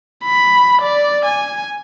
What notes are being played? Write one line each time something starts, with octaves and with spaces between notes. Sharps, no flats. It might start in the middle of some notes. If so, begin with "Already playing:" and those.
B5
D5
G#5